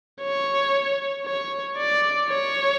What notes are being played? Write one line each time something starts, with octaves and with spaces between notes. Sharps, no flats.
C#5
C#5
D5
C#5